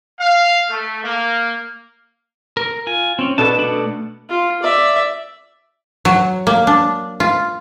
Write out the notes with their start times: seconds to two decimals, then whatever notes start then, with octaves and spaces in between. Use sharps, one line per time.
0.19 F5
0.69 A3
1.04 A#3
2.57 A#4
2.87 F4 G#5
3.19 C4 C#4
3.38 B2 B3 D4 A4 A5
3.59 A3 D4
4.29 F4
4.62 D5 E5
6.05 F#3
6.47 A#3
6.67 D4
7.20 F4